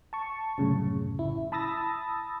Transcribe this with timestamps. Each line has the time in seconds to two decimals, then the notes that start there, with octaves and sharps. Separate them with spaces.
0.13 A5 C#6
0.58 C2 F#2 A2 C#3
1.19 A1 E4
1.52 A5 B5 D#6 E6 A6 A#6